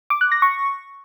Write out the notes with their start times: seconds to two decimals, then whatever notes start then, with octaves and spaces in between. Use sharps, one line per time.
0.10 D6
0.21 F#6
0.32 A#6
0.42 C#6